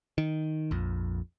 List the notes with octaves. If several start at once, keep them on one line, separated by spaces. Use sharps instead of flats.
D#3
A#1 F2